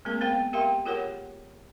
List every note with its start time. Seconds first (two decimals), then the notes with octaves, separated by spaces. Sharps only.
0.05 G#3 A#3 C4 G#4 A#4
0.21 B3 G#4 A#4 C5 F5 G5
0.53 G4 A#4 E5 F5 G5 C6
0.85 F4 G4 G#4 A#4 C#5 F#5